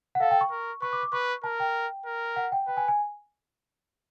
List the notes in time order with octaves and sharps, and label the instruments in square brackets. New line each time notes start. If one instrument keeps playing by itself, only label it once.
[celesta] F#5
[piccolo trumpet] A4 [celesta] F5
[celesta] G5
C#6
[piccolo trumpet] A#4
[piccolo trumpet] B4 [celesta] C#6
[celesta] D6
D6
[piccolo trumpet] B4 [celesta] C#6
[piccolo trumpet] A#4 [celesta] A5
[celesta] G5
[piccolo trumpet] A#4
[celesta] F#5
G5
[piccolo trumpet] B4 [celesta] G5
[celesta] G#5
G#5